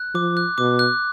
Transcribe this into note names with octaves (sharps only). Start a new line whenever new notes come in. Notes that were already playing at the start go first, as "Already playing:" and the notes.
Already playing: F#6
F3 D6
F#6
B2 D6
F#6